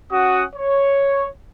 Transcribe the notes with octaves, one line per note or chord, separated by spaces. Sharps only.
C#4 F#4 F#5 D#6
C#5